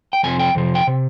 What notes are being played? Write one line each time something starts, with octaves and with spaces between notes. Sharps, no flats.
G5
F2 C3 F3 G#5
G5
F2 C3 F3
G5
C3